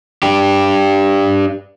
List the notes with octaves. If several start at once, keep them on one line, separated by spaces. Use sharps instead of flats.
D4 G4